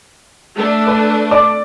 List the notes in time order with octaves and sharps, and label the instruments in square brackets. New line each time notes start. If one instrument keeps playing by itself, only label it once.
[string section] A3 D4
[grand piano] B4
D5 D6